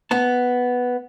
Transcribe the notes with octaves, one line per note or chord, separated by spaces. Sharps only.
B3 A5